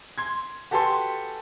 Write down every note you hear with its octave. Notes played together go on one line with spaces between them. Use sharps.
C6 G#6
F#4 G4 A4 B4 G#5 C6